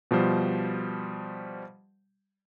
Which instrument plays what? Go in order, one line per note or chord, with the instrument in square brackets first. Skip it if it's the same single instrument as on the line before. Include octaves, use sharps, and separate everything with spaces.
[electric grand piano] B2 F3 G3 C5